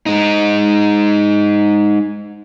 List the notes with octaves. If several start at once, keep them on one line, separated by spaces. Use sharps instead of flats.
G#3 D#4